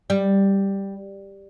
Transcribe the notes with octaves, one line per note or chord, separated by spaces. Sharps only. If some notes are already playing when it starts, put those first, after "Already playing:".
G3